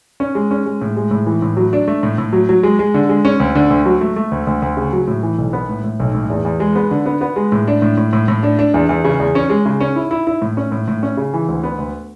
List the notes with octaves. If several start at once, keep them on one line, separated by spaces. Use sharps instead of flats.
C#4
G#3
C#4
G#3
A2
G#3
A2
E3
A2
F#3
D4
A3
A2
A2
F#3
F#3
G#3
G#3
D3
G#3
C#4
D2
D3
D2
F#3
A3
A3
D2
D2
D2
C#3
F#3
A2
E3
B1
B3
A2
A2
B1
A2
E2
E2
G#3
B3
D3
B3
B3
G#3
A2
D4
A2
A2
A2
A2
D4
D4
E2
E2
C#3
E2
C#4
G#3
C#3
C#4
E4
E4
E4
A2
C#4
A2
A2
C#4
C#3
E3
D2
B3
D2